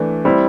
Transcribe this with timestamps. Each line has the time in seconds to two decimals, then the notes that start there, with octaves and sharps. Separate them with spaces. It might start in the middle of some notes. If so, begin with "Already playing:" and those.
Already playing: E3 A3 D4
0.25 G3 C4 E4